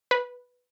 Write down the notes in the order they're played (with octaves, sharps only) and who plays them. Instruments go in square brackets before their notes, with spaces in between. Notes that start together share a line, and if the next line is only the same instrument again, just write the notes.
[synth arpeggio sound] B4